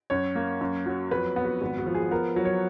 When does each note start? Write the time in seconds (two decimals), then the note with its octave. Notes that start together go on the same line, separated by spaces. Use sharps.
0.10 F#2 C#5
0.35 A#3
0.61 F#2
0.86 F#3
1.11 F2 B4
1.36 B3
1.44 F#4
1.61 G#1 F#4
1.78 F#4
1.86 F3
1.95 G#4
2.11 B3 A#4
2.36 F#3
2.45 C#5